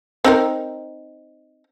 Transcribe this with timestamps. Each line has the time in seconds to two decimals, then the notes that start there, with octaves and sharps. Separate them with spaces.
0.24 C4 D#4 A#4